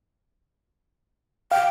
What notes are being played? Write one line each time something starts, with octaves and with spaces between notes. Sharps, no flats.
F5 G5